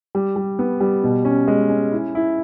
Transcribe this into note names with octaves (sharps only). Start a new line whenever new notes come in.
G3
G3
B3
G3
B2
C#4
G#3
C#4
E4
E4